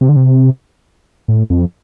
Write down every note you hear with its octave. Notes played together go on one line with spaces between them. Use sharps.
C3
D3
C3
A2
F2